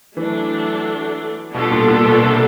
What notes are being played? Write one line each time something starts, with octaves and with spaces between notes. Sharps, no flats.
E3 F#3 A3 D4
B2 G3 B3 D4 F4 A4
A#2
A#2
B2
C3